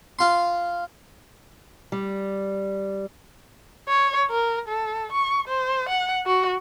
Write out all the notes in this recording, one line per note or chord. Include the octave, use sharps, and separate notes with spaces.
F4 C6
G3
C#5
A#4
A4
C#6
C5
F#5
F#4